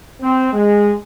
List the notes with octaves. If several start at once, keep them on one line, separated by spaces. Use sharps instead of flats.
C4
G#3